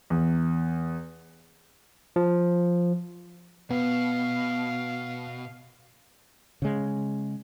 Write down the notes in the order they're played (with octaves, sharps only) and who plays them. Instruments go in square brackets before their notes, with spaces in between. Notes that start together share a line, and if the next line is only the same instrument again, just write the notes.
[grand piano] E2
[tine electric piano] F3
[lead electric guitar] B2 [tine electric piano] B3 [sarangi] F5
[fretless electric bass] C#3 G#3